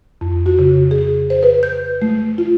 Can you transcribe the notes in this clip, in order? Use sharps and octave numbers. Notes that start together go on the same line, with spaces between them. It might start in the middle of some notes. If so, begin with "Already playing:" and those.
F2
F#4
C#3
G#4
C5
B4
G6
A3
F4